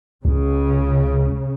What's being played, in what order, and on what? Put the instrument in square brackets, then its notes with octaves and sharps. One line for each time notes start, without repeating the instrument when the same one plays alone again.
[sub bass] C#2 [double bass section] C#3